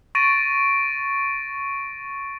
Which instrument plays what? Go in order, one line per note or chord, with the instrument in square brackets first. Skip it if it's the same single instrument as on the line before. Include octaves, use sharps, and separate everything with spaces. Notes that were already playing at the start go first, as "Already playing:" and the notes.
[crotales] C#6 A6 A#6 D7 D#7